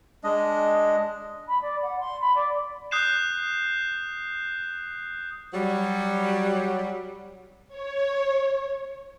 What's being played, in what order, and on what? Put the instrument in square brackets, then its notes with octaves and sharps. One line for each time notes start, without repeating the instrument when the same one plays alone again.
[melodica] G#3 D4 D#5
[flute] B5
D5
F#5
C6
B5
D5
[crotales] D#6 F#6 G6 C7 E7
[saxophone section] F#3 G3
[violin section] C#5